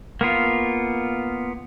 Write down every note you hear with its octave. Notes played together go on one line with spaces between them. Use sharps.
A#3 B3 F4